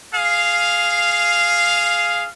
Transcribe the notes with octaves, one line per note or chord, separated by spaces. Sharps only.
G#4 F5